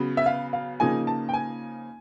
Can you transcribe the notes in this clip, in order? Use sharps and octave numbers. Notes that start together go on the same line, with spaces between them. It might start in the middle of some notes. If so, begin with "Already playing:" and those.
Already playing: C#3 F#3 B3
E5
F5
F5
C#3 F3 A#3 D#4 G#5
A5
G5
G#5